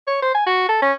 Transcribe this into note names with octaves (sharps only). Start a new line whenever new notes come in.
C#5
C5
G#5
F#4
A4
C#4